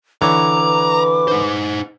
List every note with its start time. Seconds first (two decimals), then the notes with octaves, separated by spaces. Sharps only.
0.22 D3 E3 C#5 A#5 D6
0.56 B4
1.28 D#4 C5